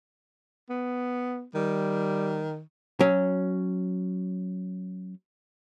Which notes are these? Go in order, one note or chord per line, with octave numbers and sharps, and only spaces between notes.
B3
D#3 G3
F#3 C#4